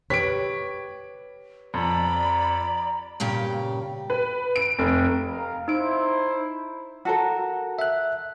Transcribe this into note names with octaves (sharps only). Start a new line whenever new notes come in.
G4 B4 C#5 B6 D7
F2 D5 A#5 B5
G2 A#2 C#3 G4
B4
D7
F1
A#4 F5
D#4 E4 C5 D7
F#4 A4 A#4
E5 F#6